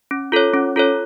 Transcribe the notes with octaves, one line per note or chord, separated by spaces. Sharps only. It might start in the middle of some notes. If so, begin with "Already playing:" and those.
C#4
F4 A4 C#5
C#4
F4 A4 C#5